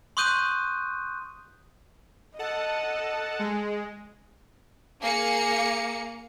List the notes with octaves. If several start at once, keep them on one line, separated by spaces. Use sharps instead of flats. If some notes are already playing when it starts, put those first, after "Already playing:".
C6 C#6 D#6 F#6 G6 D#7
A4 D#5 F#5 A5
G#3
A#3 G#4 F5 C#7